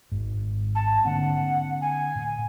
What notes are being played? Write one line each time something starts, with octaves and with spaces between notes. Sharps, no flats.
G#1 G#2
A5
D3 A#3 C4 F#5
G#5
A2